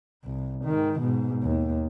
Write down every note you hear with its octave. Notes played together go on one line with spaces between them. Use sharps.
C2
G#2 D#3
G#2 B2
D#2